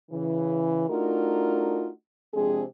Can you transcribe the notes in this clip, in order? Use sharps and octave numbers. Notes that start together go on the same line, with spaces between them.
C#3 E3
A3 D4 D#4 F4 F#4 A#4
C3 F3 G#3 C4 D4 G#4